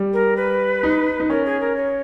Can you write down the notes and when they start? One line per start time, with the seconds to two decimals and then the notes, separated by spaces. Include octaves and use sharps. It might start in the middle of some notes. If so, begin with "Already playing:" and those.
Already playing: G3
0.13 A#4
0.37 B4
0.83 D#4
1.20 D#4
1.30 C#4 A#4
1.45 G#4
1.61 A#4
1.76 C#5